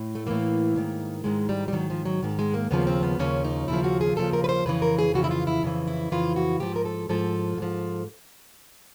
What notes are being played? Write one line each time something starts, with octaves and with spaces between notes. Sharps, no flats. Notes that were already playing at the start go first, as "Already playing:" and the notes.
Already playing: A2
A3
A2 E3 A#3
G#2 D#3
G#2 D#3 G#3
G3
G3
G#2 D#3 F#3
F3
F#3
G#2 D#3
G#3
A#3
D#2 C#3 F3 B3
C4
B3
D#2 C#3 F3 C#4
D#4
D#2 C#3 F3 E4
F#4
G#4
D#2 C#3 F3 A4
A#4
B4
C5
F2 C#3 E3 B4
A#4
G#4
F2 C#3 E3 F#4
E4
F4
E4
F2 C#3 E3
E4
F2 C#3 E3 F4
F#4
G#2 F3 G4
A#4
A4
G#2 F3 A4
G#2 F3